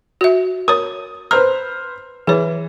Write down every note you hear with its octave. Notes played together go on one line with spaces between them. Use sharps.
F#4 E5
A#4 C#5 D#6
B4 C5 A#5 F6
E3 G#4 C#5